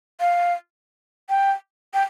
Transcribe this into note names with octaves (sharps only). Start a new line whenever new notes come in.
F5
G5
G5